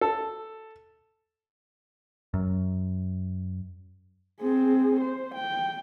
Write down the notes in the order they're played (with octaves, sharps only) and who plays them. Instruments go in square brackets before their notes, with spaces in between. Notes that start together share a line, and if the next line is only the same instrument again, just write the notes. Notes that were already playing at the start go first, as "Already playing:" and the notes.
[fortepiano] A4
[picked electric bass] F#2
[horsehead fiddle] C4 G#4
C5
G5